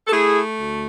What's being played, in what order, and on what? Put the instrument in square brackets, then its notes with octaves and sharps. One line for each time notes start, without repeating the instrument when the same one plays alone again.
[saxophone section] A4
A3 E4 G#4
D2